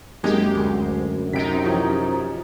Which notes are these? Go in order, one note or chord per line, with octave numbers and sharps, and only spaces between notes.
F#2 G#3 A#3 D#4 G4
D2 G#3
C3 D#4 B6 D7
E3 F3 C#4